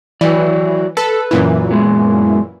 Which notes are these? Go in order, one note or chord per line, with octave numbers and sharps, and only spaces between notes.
E3 F#3 D5
A4 B4
F#2 A#2 E3
G#3 B3